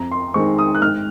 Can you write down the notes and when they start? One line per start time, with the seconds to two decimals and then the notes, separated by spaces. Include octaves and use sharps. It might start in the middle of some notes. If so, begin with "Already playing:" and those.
Already playing: F2 A#5
0.12 C6
0.34 D#3 G#3 C4 C#6
0.59 D#6
0.75 F#6
0.82 G#2 F6